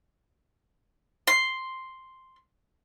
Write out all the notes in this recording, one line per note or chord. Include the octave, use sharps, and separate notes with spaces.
C6